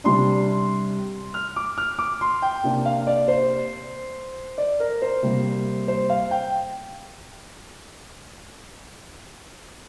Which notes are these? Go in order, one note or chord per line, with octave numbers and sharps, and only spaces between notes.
C3 G3 D4 C6
F6
D6
F6
D6
C6
G5
C3 A#3 D4
F5
D5
C5
D5
A#4
C5
C3 G3 A#3
C5
F5
G5